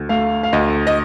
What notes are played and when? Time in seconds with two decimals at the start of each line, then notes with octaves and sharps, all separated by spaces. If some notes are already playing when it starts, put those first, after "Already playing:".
Already playing: D2
0.09 A3 F5
0.43 F5
0.53 D2 D#5
0.87 D#5